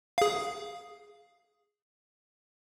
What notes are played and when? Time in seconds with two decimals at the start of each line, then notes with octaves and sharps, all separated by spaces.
0.18 G#4 F5